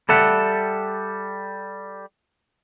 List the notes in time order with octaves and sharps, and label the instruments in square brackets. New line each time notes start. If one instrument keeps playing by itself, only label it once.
[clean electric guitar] G3 A4 E5 F#5